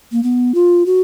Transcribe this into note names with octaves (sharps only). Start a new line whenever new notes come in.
A#3
B3
F4
F#4